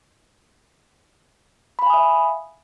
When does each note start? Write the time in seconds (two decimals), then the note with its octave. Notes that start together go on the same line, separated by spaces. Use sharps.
1.79 B5
1.82 F5
1.86 G#5
1.90 D#6
1.94 E5